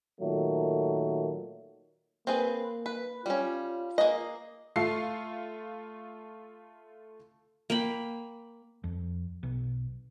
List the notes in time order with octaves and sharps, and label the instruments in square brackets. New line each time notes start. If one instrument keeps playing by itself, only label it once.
[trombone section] A#2 D#3 F#3 A3
[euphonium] A#3 [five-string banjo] C4 G#4 B4
[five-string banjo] B4
[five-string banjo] G3 C#4 [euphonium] F4
[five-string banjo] A#3 G#4 D#5
[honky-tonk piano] A3 F4 C7
[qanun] A#3 G5 B5
[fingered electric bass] F2
B1